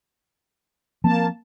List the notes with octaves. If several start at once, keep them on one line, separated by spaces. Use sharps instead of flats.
F3 A#3 C4 A5